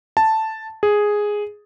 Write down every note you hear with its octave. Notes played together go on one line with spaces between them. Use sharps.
A5
G#4